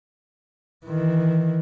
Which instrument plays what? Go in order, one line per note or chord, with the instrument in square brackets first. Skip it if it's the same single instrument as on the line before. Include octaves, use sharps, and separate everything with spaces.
[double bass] D#3 E3